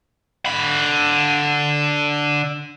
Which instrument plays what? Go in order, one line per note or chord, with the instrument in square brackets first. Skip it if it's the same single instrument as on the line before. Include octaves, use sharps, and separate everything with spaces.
[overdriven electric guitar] D3 B5